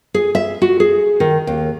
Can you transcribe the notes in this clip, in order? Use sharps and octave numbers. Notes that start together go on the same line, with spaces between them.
G#4
E5
F#4
G#4
D#3
D#2